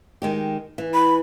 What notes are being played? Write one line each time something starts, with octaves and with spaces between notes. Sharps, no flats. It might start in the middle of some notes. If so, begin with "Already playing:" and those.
D#3 G#3 G4
E3
B5